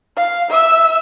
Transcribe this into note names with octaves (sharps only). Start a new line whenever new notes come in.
F5
E5 E6